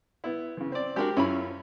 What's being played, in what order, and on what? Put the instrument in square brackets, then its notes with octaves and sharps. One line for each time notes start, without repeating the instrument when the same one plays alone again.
[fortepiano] B3 E4
C#3 E3
C4 D5
[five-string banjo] G#3 D4 F#4 [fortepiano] G4 A#4
[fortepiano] F#2 E4 [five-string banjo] C#4 F4 B5